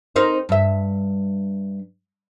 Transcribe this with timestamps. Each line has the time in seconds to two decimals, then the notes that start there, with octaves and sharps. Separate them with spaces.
0.16 C4 D#4 A#4
0.49 G2 E5